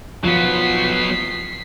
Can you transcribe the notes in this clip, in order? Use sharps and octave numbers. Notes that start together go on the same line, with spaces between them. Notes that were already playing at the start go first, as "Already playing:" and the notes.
F3 F#3 B3 F4 B6 C7